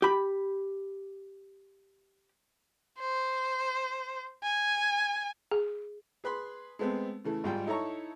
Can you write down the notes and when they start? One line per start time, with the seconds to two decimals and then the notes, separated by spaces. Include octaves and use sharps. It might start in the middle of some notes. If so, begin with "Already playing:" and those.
0.02 G4 B5
2.99 C5
4.44 G#5
5.51 G#4
6.24 G#4 B4 B5 C6
6.79 G#3 A3 B3 C4
7.24 C#3 E3 A3
7.44 G#1 G#2 G3 F4 G5
7.66 D#4 E4 A4 C#5 A#5 C#6